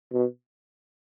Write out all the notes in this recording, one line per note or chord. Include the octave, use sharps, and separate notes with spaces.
B2